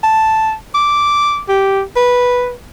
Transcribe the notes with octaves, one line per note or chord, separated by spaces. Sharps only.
A5
D6
G4
B4